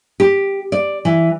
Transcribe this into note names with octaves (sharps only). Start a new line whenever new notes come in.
G4
D5
E3